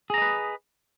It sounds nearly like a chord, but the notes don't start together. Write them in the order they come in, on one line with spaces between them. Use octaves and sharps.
G#4 A#5 D#5 B4